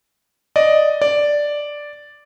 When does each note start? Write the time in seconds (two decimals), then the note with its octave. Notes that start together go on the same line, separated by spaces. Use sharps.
0.56 D5 D#5
1.02 D5